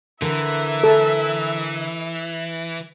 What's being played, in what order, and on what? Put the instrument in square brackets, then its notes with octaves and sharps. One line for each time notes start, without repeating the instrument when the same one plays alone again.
[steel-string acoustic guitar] D3 A#4 [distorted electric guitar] E3 [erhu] E5
[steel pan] A4